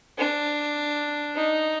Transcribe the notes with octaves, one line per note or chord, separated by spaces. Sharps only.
D4
D#4